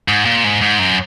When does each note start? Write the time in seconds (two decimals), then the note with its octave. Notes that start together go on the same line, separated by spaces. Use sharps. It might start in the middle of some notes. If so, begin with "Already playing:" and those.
0.08 G#2
0.25 A#2
0.44 G#2
0.61 G#2
0.79 F#2